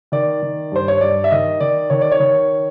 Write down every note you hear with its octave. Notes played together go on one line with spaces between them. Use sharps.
D#3 D5
D#3
G2 C5
C#5
G2 D5
E5
D#3 D#5
D#3 D5
D#3 C#5
D5
C#5
D#3